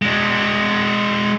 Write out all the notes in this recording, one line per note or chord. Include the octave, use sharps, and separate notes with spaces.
G#3 D4